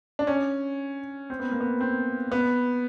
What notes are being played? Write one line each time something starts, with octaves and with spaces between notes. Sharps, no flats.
D4
C#4
C4
B3
A#3
B3
C4
B3